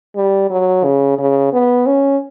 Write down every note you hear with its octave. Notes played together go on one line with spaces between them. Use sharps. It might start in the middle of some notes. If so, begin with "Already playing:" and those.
G3
F#3
C#3
C#3
B3
C#4